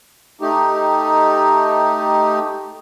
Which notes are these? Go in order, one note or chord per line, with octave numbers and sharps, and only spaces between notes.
A3 D#4 G4